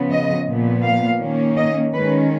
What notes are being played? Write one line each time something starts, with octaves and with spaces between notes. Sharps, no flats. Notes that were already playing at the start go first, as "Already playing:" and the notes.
Already playing: C#3 F3 B3
D#5
A#2 F3 B3
F5
D#3 A#3 C#4
D#5
D#3 G#3 C#4 B4